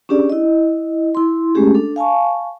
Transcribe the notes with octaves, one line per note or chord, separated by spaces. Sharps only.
C#4 D4 G4 G#4 D5
E4 D#5
E4 C6
G#3 A3 C#4 G4 G#4
D4 A4
F5 G#5 A5 C#6